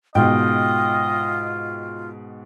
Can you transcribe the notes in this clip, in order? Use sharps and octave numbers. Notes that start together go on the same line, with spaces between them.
G#2 B2 F4 D#5 G5